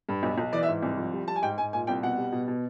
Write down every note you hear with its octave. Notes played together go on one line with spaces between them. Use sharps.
G2
B1
B1
E3 D5
E5
G#2
C2
F3
G3
G3 A5
G#5
G#2 G5
G#2 G#5
A#2 G#5
C2 G5
B2 F#5
G3
B2
B2